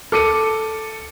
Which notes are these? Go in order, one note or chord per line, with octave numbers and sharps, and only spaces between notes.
A4 D6 C#7 D#7